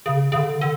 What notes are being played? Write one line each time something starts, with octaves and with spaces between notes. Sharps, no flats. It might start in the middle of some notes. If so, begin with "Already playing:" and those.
C#3
C#3
D3
D3